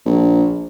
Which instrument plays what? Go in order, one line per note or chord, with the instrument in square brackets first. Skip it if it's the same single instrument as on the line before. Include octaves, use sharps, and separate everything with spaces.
[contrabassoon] A#1